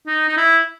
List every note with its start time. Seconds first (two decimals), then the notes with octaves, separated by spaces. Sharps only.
0.07 D#4
0.29 D#4
0.37 E4